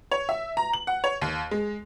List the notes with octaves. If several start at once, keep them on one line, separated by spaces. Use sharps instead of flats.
C#5
E5
A#5
F#7
F#5
C#5
D#2
G#3